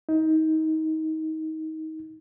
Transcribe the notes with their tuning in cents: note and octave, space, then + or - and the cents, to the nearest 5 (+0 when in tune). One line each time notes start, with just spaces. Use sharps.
D#4 +25